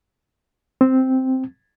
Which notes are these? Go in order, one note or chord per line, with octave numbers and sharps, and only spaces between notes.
C4